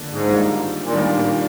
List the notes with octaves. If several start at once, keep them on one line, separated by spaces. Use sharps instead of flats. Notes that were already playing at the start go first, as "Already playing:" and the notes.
Already playing: D3 F3 A#3 D4
G#2
D#3 G3 A#3 D4 F4
A#2
A2 D#3 G3 A#3 D4 F4
A#2